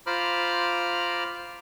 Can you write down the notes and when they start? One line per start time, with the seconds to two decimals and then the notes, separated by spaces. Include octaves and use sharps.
0.06 F4 C5 A#5 B5 D6 F6